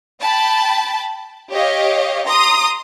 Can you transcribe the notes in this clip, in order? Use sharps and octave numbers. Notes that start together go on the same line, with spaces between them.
G5 A5 B5
G4 C#5 D#5 F5
A#5 C6 D#6